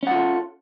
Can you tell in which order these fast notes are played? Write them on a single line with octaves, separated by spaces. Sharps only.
C#4 F#5 F4 A4